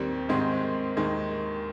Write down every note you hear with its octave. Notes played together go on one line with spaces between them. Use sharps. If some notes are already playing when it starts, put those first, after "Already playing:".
Already playing: D#2 D#3 G3 C4
G#2 D#3 G#3 C4
D#2 D#3 G#3